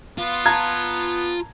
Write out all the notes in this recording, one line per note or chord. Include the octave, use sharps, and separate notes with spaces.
B3 F4
A5 A#5 G#6